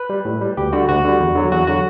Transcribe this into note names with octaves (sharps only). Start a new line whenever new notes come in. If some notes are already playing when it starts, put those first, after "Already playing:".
Already playing: B4
G3
A2
G3
D2 G4
D3 G3 F#4
D2 F#4
D3 G3
E2
D3 F#3
E2 F#4
D3 F#3 F#4